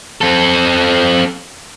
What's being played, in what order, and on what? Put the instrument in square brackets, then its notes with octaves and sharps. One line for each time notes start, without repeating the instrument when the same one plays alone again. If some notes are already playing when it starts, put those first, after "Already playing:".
[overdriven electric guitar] C4 A4